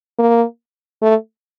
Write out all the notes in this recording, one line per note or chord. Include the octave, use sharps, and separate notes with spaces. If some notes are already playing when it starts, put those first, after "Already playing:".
A#3
A3